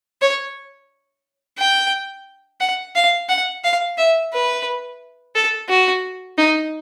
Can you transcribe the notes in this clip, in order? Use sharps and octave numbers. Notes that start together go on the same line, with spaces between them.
C#5
G5
F#5
F5
F#5
F5
E5
B4
A4
F#4
D#4